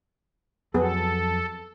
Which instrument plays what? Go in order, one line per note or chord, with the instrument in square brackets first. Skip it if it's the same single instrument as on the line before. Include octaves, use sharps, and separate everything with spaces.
[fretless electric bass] F2 F#3 [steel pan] B3 G#4 [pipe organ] A4